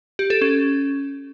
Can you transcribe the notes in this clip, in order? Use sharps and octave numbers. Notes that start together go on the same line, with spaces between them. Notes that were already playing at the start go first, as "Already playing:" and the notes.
G4
A4
C#4